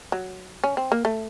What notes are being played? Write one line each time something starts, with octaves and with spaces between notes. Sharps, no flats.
F#3
C#4
C4
A#3
A3